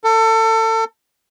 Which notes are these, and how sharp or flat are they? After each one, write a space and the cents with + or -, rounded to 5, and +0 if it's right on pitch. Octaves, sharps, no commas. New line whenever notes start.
A4 +30